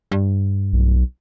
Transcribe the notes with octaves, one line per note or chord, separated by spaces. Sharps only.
G2
B1